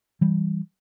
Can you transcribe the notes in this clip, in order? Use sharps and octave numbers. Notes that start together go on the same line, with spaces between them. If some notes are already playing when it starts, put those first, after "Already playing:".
E3 G3